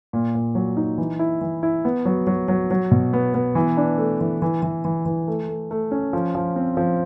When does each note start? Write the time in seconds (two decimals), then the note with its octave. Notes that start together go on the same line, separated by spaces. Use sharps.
0.13 A#2
0.35 A#2
0.55 F#3
0.77 D#4
0.98 E3
1.19 E4
1.41 E3
1.63 E4
1.85 B3
2.05 F#3
2.27 F#3
2.48 F#3
2.71 F#3
2.91 B2
3.13 B3
3.34 B3
3.55 E3
3.77 D4
3.98 A3
4.21 E3
4.42 E3
4.62 E3
4.84 E3
5.06 E3
5.28 A3
5.49 A3
5.71 A3
5.91 C#4
6.13 F3
6.35 F3
6.56 C4
6.77 F3